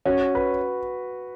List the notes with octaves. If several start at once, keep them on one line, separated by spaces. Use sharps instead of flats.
C#4 F#4
B4